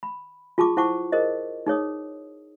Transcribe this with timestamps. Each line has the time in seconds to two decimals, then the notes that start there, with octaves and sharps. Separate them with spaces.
0.03 B5
0.58 F4 G#4 A5 C#6 D6
0.77 E4 C5 F#5 A5 C#6 D6
1.12 G#4 A#4 C5 D#5
1.66 D#4 G#4 C#5 D#6